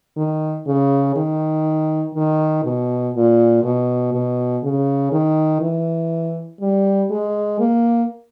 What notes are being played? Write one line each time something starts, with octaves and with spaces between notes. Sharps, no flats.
D#3
C#3
D#3
D#3
B2
A#2
B2
B2
C#3
D#3
E3
G3
G#3
A#3